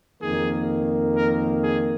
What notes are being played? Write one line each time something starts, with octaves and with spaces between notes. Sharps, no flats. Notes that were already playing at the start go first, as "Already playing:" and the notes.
F2 D#3 A#3 G#4
A#4
G#4